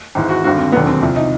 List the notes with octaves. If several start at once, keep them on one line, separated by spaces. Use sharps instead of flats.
G#1 G#2 E3
F#4
G#1 G2 D3 F#4
C4
E1 D#2 D3 F#3 B3
C4
C2 C3 F3
D#4